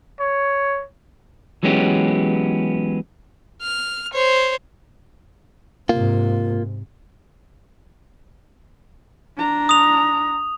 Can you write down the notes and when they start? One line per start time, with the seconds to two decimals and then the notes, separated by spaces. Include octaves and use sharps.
0.20 C#5
1.63 E3 F#3 G#3 B3 C#4 G4
3.62 F6
4.13 C5 C#5
5.89 G#2 C3 A#3 F4
9.37 D4 A#5
9.69 D#6 F7